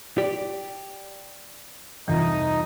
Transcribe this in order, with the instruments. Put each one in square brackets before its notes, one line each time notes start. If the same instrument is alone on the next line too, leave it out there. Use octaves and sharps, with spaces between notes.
[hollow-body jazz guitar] G4 D5
[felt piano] C2 F2 [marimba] E3 [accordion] D#4